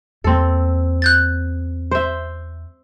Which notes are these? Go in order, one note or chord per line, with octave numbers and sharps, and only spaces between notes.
E2 A#3 C4 A4
F#6 G6 A6
C5 E5